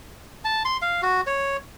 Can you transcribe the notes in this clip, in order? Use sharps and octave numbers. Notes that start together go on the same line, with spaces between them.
A5
C6
F5
F#4
C#5